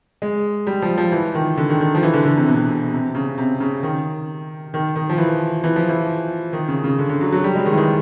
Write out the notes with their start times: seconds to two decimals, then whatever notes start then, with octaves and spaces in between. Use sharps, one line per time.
0.22 G#3
0.67 G3
0.82 F3
0.98 F3
1.12 E3
1.35 D#3
1.57 D3
1.69 D#3
1.81 D#3
1.95 F3
2.03 E3
2.14 D3
2.25 D3
2.37 C3
2.48 B2
2.71 B2
2.93 C3
3.15 C#3
3.38 C3
3.60 C#3
3.83 D#3
4.74 D#3
4.96 D#3
5.09 F3
5.18 E3
5.64 E3
5.76 F3
5.89 E3
6.53 D#3
6.68 C#3
6.84 C#3
6.98 D3
7.09 D3
7.21 F#3
7.32 F#3
7.44 G3
7.55 G#3
7.66 D#3
7.73 E3
7.77 D#3